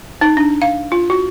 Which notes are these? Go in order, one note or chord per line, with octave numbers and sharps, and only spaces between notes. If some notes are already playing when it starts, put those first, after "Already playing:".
D#4
D4
F5
F4
F#4